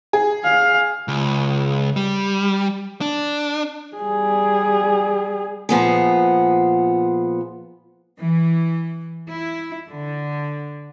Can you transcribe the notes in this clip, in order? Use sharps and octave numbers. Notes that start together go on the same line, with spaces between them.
G#4
F5
C#2
G3
D4
G3 G#4
A#2 F3 B3 G#4
E3
E4
D3